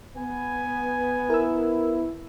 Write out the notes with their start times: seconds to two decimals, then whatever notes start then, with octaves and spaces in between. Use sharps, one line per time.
0.17 B3 G#5
1.30 E4 A#4 E6